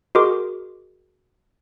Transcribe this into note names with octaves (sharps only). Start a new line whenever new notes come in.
F#4 G#4 A#4 D#5 C6 D6